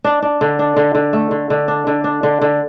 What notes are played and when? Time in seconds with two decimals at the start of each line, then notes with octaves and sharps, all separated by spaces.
0.04 D4
0.22 D4
0.41 D3
0.59 D4
0.77 D3
0.95 D3
1.13 A3
1.31 D3
1.50 D3
1.68 D4
1.87 D3
2.04 D4
2.23 D3
2.41 D3